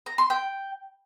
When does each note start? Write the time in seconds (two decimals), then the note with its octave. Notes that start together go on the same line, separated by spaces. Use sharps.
0.06 A#5
0.18 C6
0.30 G5